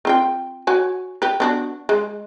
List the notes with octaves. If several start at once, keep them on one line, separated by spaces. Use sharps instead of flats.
C4 F4 G5
F#4 C#5 G#5
G4 B4
B3 D4 F#4
G#3